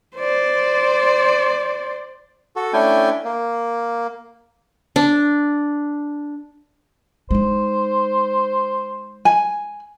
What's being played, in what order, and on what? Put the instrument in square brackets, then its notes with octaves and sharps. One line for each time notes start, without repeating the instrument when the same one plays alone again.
[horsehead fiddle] C5 D5
[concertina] F#4 A4
A3 C#4 D4 E4 G5 G#5
A#3
[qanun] D4
[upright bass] G#3 D#4 [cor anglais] C5
[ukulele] G#5